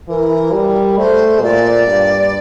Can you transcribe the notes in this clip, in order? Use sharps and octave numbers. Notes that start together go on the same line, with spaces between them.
E3 A#4
G3
A3 C5
A#2 D5
G2